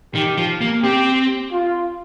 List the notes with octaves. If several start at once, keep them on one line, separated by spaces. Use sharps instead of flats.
D#3 G4
F3
A#3
C4 G4
F4